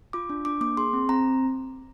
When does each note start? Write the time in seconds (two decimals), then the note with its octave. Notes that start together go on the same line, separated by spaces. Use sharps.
0.13 F4 D6
0.30 D4
0.45 D4 D6
0.61 A#3 D6
0.77 G#4 C6
0.93 C4
1.09 C4 A#5